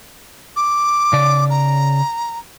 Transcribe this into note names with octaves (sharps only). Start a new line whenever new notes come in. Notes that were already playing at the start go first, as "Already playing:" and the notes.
D6
C#3 D5
A#5